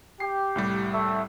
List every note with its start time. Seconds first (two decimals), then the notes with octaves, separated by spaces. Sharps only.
0.20 G4 C7
0.56 C2 A2 G3
0.93 A3 E5